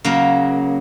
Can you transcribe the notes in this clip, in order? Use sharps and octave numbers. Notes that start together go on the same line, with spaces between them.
C#3 F#3 A#3